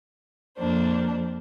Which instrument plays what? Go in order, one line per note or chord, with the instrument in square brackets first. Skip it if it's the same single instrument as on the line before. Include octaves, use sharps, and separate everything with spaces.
[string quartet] F2 A#3 D4 C5